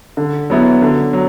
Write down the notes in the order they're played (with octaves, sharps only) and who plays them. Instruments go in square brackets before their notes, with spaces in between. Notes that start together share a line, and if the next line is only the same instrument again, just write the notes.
[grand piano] D3
F#3 B3 E4
D3
F#3